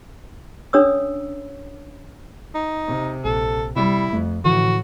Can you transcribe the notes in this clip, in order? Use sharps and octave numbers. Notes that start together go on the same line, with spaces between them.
C#4 D4 A4 C#5 D#6 E6
D#4
C3
A#1 A4
C3 G3 E4
F2 A3
A2 D3 E3 F3 F#4